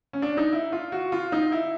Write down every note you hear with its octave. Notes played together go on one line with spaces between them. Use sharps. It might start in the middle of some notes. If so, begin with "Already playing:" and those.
C#4
D4
D#4
E4
F4
F#4
F4
D#4
E4